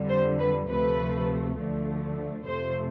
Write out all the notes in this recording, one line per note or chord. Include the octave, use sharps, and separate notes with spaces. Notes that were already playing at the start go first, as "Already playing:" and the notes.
Already playing: F2 D3 G3
C5
B4
D2 C3 F3 A3 B4
D2 D3 F3 A3
F2 C3 F3 A3 C5